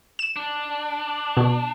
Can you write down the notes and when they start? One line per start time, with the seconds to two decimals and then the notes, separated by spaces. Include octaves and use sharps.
0.19 E7
0.36 D4
1.37 B2